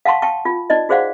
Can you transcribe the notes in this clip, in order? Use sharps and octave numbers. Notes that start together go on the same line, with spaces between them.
F5 F#5 A5 C6 C#6
G5 A5 C#6
F4
D#4 D5 D#5
F#4 G#4 C5 D5 F5 F#5